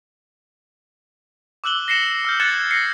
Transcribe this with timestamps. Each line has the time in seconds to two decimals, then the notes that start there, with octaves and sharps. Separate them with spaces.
1.64 D6 E6 F#6 F#7 G7
1.88 A#6 C7 C#7 E7
2.25 E6 F6 G6
2.40 F#6 G#6 A6 C#7 E7
2.71 A#6 C7 C#7